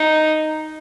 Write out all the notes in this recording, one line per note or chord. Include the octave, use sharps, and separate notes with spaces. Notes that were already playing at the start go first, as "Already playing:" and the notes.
Already playing: D#4